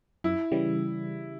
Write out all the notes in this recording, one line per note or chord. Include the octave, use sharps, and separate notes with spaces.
F#2 E4
C#3 E3 G3